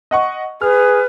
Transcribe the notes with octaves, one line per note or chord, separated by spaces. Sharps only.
D#5 F#5 C#6
G#4 B4 F6